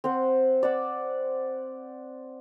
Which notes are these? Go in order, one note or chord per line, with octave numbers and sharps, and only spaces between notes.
C4 C5 F#5
D5 F#5 E6